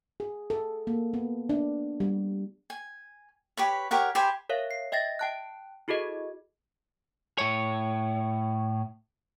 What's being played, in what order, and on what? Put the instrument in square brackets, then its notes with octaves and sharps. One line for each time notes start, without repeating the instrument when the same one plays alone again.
[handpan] G#4
A4
A#3
B3
D4
G3
[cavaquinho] G#5
G4 B4 C#5
G4 A#4 C#5 F#5
G4 C5 G#5 B5
[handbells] A#4 C#5 E5 F5
C7
D#5 E5 G5 A6 A#6
G5 A5 F#6
E4 F#4 G#4 A4 D#5
[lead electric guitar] A2 C#5